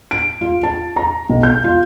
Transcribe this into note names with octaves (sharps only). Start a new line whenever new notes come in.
D7
F4
A5
A#5
B1
G6
F4